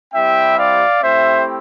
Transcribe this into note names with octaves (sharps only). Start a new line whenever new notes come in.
G3 C4 E4 G4 E5 G5
D5 F5
A3 C4 E4 G4 C5 E5